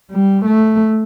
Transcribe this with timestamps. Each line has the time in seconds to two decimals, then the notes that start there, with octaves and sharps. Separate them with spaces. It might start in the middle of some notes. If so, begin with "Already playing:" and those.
0.12 G3
0.46 A3